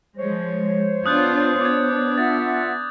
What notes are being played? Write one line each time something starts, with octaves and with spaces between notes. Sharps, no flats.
F3 G#3 C5 C#5
B3 D4 F4 D#6 F#6 G6
B3 D4 D6 G#6
F4 E5 F#5 A6